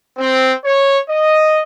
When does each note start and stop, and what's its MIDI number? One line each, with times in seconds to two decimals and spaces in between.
0.17 0.53 60
0.64 0.98 73
1.09 1.63 75